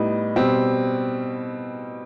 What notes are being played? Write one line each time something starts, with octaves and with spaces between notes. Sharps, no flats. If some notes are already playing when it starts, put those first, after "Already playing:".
Already playing: A2 G3 B3 D#4
B2 G3 C4